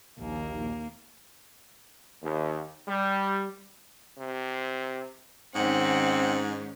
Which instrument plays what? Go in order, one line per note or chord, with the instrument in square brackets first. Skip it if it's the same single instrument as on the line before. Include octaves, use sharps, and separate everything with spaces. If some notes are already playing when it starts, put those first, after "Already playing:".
[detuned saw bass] A#1 [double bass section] D#2 [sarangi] A#3
[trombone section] D#2
G3
[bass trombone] C3
[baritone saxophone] G#2 [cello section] D#3 C#4 [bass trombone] C4 [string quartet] F#5